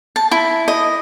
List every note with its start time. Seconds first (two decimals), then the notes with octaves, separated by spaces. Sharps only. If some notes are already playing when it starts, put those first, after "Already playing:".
0.16 A5
0.31 E4
0.68 D#5